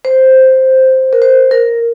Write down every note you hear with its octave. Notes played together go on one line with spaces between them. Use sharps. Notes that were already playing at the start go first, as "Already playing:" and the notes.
C5
A#4
C5
A#4